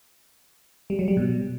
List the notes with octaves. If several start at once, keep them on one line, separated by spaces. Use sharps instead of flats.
G3
F#3
G3
B2